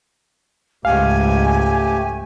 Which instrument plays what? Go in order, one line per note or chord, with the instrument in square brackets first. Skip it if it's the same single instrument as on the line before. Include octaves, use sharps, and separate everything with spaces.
[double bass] C#2 G#2 [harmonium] A3 G4 [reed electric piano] F5 [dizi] G#5